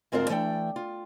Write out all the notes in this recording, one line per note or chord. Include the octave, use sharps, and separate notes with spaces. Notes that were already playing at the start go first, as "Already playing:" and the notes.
D2 G#2 C4 F4 A#4 C5
E3 A3 D4 G5
F4